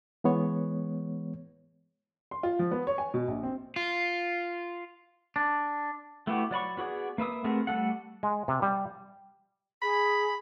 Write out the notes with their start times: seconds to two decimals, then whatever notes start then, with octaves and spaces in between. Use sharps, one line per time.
0.24 E3 G#3 B3 C#5
2.31 C6
2.43 F4
2.59 F3
2.71 B3
2.87 C#5
2.98 G#5
3.14 B2
3.28 A#1
3.43 C4
3.76 F4
5.36 D4
6.27 A3 B3 E4 F#4 G4
6.51 F#3 D5 B5 C#6
6.77 B3 F#4 G#4 D5
7.18 A#3 B4 E5 D#6
7.44 A3 B3 C4 G#4 A#4
7.67 G3 A3 A4 F#5
8.23 G#3
8.48 C3
8.62 G3
9.82 G#4 B5